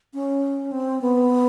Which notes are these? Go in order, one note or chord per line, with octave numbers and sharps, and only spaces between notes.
C#4
C4
B3